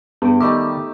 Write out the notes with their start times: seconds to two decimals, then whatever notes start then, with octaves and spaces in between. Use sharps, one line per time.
0.22 G2 B3 G5
0.41 D#3 G3 A3 D#4 G4 D6